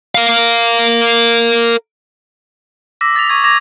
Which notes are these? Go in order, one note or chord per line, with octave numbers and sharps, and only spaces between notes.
A#4 F5
D6 E6 A#6 B6
D#6 A6 B6 F7
C#6 G#6
D6 G#6 A#6 F7